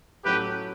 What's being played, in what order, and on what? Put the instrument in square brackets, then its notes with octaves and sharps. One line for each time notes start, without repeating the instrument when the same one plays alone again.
[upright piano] A2 F#3 C#4 F#4 A4 [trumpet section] G4 B4